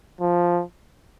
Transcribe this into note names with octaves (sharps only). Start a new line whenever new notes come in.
F3